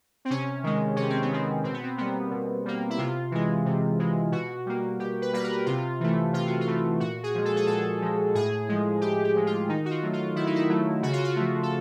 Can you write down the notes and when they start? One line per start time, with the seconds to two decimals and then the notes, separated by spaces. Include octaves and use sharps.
0.25 C4
0.30 C3 C#4
0.63 D#3 G#3
0.96 C3 C#4
1.09 C4
1.22 B3
1.31 D#3 G#3 C4
1.64 B2 C4
1.74 B3
1.83 C4
1.97 G3 A#3 B3
2.31 B2
2.65 G3 A#3
2.90 E4
2.98 C3 F4
3.31 E3 G#3
3.65 C3
3.99 E3 G#3
4.32 B2 F#4
4.66 G3 A#3
4.99 B2 G4
5.22 B4
5.33 G3 A#3 B4
5.44 A#4
5.66 C3 F4
6.00 E3 A3
6.33 C3 F4
6.47 F#4
6.61 F4
6.67 E3 A3
7.00 A#2 F#4
7.23 G#4
7.35 F3 G#3
7.45 A4
7.56 G#4
7.67 A#2 A4
8.01 F3 G#3
8.35 A2 G#4
8.69 F3 G#3
9.01 A2 G4
9.24 G4
9.35 F3 G#3
9.46 F4
9.68 D#3 D#4
9.85 F#4
9.90 F4
10.03 F#3 A3
10.13 F4
10.36 D#3 E4
10.46 D#4
10.55 E4
10.69 F#3 A3
11.02 C#3 F#4
11.13 F4
11.24 F#4
11.36 F3 A3
11.63 A4